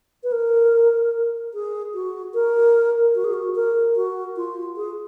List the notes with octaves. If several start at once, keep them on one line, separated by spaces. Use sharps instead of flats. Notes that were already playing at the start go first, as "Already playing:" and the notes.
B4
A#4
G#4
F#4
A#4
F#4
G#4
F#4
A#4
F#4
F4
G#4